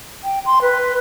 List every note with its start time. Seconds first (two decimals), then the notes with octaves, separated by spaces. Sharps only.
0.24 G5
0.46 C6
0.62 B4